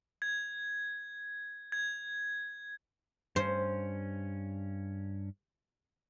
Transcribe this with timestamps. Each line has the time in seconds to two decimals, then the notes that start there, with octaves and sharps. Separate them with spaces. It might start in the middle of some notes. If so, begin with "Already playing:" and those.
0.22 G#6
1.72 G#6
3.36 G2 C#4 C5